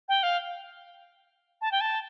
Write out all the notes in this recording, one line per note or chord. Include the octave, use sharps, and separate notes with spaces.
G5
F5
A5
G5
A5